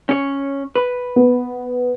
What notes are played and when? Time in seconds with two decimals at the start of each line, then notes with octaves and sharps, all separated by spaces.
0.09 C#4 C#5
0.75 B4
1.16 B3